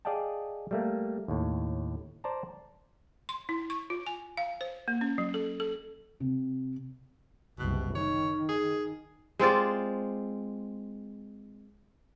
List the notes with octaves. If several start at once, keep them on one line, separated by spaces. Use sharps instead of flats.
G#4 D5 D#5 F5 G5 A5
G3 A3 A#3
D#2 A2
C5 D5 A5 A#5
C6
E4
C#6
F4
G#5
F5
C5
A#3
C#4
F#3
A4
A4
C3
F#1 C2 B2
D#3 C#5
G#4
G#3 C4 F4 D5